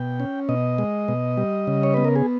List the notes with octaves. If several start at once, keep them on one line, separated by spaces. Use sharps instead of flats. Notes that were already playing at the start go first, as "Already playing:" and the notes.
Already playing: B2 G5
C#4
B2 D#5
G#3
B2
G3
C#3
C#5
B3 B4
A#4
G#4